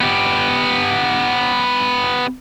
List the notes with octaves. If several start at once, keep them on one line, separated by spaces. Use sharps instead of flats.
B3 G4